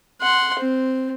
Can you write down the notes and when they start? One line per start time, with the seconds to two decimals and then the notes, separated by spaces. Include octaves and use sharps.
0.21 F#5 C6
0.59 C4